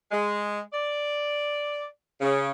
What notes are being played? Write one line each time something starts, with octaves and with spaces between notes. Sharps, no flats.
G#3
D5
C#3